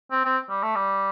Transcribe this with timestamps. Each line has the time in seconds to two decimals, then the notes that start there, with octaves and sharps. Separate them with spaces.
0.11 C4
0.25 C4
0.49 G3
0.62 A3
0.75 G3